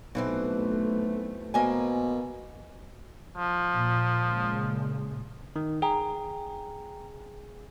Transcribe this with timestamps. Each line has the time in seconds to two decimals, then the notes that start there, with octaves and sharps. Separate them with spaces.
0.15 B1 B2 E3 A3 C4
1.54 B2 A#3 C4 G#5
3.37 F3
3.74 A#2
4.25 A#2 C#3 G#3
5.56 D#3
5.82 G#4 G5 A#5